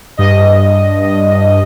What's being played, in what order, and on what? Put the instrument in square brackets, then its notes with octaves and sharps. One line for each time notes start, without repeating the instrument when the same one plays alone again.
[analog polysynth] G2 D#5